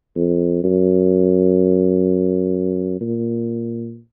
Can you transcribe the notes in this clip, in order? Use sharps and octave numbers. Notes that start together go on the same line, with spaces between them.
F2
F#2
A#2